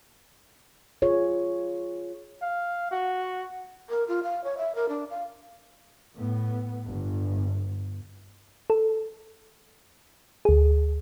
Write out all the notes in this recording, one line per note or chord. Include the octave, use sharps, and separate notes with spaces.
F4 G#4 C#5
F5
F#4
A#4
F4
F5
C#5
E5
A#4
D4
F5
A2 B3
G1
A4
D2 G#4